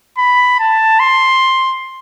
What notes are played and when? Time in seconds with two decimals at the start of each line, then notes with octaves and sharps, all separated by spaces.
0.18 B5
0.59 A5
0.99 C6